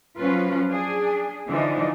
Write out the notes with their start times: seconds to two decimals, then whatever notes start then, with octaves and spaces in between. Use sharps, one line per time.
0.17 F3 F#3 C#4 F4 B4
0.69 D4 G#4
1.47 D3 E3 F3 D4 D#4